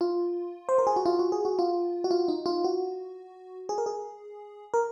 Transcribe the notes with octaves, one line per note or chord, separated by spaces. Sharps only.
F4
C5
A#4
G#4
F#4
F4
F#4
G#4
F#4
F4
F#4
F4
D#4
F4
F#4
G#4
A#4
G#4
A#4